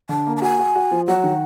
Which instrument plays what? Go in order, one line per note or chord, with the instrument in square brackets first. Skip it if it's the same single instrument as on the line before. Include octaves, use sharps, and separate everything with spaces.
[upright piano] D3 [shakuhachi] A5
[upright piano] A#3
[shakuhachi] A5
[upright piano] F#4 [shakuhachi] G#5
[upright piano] F#4
F#4
F3
[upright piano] F#3 [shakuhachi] F#5
[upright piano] D#3